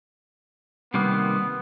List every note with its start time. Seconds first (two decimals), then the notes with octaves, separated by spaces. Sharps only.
0.94 C3 D#3 G3 A#3 B3